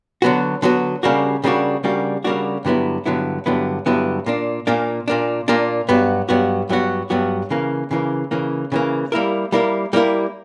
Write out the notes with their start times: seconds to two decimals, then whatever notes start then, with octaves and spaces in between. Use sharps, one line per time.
0.22 D3 F#3 B3 F#4
0.62 D3 F#3 B3 F#4
1.03 C#3 G3 A#3 D4 F#4
1.44 C#3 G3 A#3 D4 F#4
1.83 C#3 G3 A#3 D4 F#4
2.24 C#3 G3 A#3 D4 F#4
2.65 G2 D3 F#3 B3 E4
3.06 G2 D3 F#3 B3 E4
3.46 G2 D3 F#3 B3 E4
3.86 G2 D3 F#3 B3 E4
4.26 A#2 A#3 D4
4.67 A#2 A#3 D4
5.08 A#2 A#3 D4
5.48 A#2 A#3 D4
5.89 G2 F#3 B3 F#4
6.29 G2 F#3 B3 F#4
6.69 G2 F#3 B3 F#4
7.10 G2 F#3 B3 F#4
7.50 C#3 E3 A#3
7.91 C#3 E3 A#3
8.31 C#3 E3 A#3
8.72 C#3 E3 A#3
9.12 G3 A#3 E4 A#4
9.52 G3 A#3 E4 A#4
9.93 G3 A#3 E4 A#4